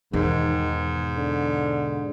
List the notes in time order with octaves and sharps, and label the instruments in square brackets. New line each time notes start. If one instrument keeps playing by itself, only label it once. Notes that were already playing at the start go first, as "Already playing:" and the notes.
[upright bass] E2 B2 [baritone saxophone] G#2 [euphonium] D#3
[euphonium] D3